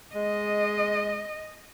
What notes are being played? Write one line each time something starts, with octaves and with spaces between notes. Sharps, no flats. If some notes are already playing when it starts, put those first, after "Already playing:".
G#3 D#5